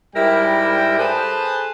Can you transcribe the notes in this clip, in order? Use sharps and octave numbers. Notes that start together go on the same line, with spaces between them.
G#2 G3 E4 A#4 G5
G#4 A4 B4 C5 A5